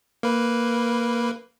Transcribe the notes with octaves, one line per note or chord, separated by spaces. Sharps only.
A#3 B4